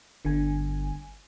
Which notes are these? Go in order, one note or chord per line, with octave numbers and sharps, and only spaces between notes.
G1 D3 G#5